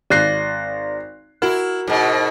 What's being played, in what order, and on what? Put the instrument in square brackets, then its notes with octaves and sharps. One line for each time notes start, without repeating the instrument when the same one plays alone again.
[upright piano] G#1 F#6 C7 [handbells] D5 A#6
[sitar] E4 [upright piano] F#4 [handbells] A#4
[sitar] G#2 B2